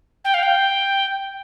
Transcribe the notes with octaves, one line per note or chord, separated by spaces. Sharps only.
G5
F5
G5